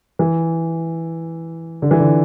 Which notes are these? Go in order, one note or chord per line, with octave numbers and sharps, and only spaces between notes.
E3
D3
E3
D3